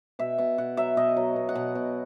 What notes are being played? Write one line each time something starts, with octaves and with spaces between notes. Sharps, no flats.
B2 E5
B2 F#5
B2 F#5
F#3 E5
B2 D#5
F#3
B2
F#5
B2
B2